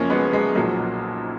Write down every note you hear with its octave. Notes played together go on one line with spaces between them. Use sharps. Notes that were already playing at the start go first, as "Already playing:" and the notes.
Already playing: F#1 F#2 F3 A#3 C#4
G#3 B3
G#3
B1 A#2 F3 F#3 A#3